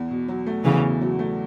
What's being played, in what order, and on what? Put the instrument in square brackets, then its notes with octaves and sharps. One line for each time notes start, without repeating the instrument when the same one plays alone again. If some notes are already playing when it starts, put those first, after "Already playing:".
Already playing: [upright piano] E2
B2
F#3
A3
[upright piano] E2 [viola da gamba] C#3 E3
[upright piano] B2
F#3
A3